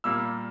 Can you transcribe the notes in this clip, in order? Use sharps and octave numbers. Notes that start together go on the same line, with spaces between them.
A#2 G3 A#3 E6